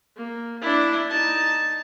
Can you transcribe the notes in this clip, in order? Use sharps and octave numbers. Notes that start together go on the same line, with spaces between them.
A#3
D4 E4
D#4 A5